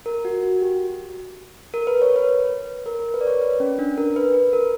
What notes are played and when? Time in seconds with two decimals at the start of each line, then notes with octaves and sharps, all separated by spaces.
0.06 A#4
0.25 F#4
0.43 F#4
0.62 G4
1.74 A#4
1.87 B4
2.02 C#5
2.16 B4
2.86 A#4
3.00 A#4
3.14 B4
3.21 D5
3.27 C#5
3.41 B4
3.60 C#4
3.79 D4
3.98 A#4
4.16 B4
4.34 B4
4.53 A#4